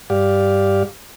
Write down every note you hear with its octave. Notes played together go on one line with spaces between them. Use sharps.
G2 G4 D5 F5